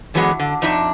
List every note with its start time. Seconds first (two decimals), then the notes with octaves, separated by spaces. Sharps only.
0.14 D3 E3 F#3 G#3 B3
0.39 D3
0.62 F2 D4 D#4 E5